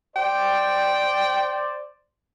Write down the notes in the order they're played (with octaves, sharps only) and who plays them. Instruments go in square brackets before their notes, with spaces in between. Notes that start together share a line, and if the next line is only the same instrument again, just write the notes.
[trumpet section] C5 D5 [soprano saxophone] G5